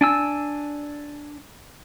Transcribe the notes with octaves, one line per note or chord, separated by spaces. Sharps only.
D4 G#5 E6